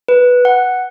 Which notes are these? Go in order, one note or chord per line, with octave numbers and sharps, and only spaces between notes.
B4
F#5